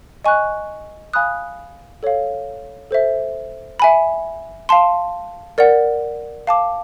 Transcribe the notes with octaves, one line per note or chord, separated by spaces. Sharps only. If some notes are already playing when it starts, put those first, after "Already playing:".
D#5 G#5 C#6 F#6
F5 G#5 B5 D#6 F#6
A4 C#5 F5
A4 C5 E5
E5 G#5 B5
F5 A5 C6
A#4 D5 F#5
F5 A5 D6